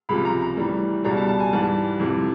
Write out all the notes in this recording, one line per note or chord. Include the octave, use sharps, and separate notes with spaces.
C#2 C3 F3 B5
A#5
A#5
A2 E3 G3
C#2 B2 G3 A#5
A5
A5
G#5
G#2 E3 G3 A5
F2 C3 E3